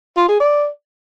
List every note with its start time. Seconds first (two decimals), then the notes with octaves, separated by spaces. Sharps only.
0.17 F4
0.28 G#4
0.40 D5